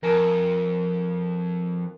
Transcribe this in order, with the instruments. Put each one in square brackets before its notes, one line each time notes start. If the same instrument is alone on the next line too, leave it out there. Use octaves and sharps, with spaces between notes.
[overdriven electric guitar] F2 [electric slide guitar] A#4 G#5 A5